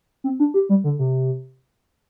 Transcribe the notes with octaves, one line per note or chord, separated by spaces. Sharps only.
C4
D4
G4
G3
D3
C3